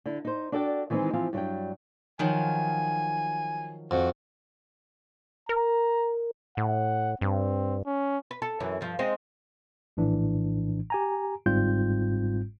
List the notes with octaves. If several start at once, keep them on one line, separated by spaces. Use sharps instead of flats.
D3 E4
D#4 C5
D4 F#4 A4 D5 D#5 G5
D#3 E3 G#3 C4 D#4
E3 F3 C4 F5
G2 F#3 G3 G5
D#3 F3 F#3 G#5
F2 F#4
A#4 A#5
A2 F#5
G2 C4
C#4
B4
A4
F#2 E3
G2 F3
G#3 C4 D#4
A#1 A2 E3 D4
G4 G#5 A#5
G1 G#2 G3 C4 F4 G6